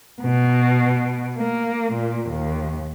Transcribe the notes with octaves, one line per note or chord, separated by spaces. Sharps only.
B2
A#3
A#2
D#2